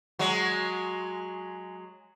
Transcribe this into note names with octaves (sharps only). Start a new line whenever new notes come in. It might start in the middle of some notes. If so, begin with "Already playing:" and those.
F#3 G#3